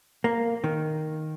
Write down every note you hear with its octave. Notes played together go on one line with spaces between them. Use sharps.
A#3
D#3